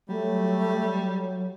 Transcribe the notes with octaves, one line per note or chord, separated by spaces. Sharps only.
F#3 G3 A3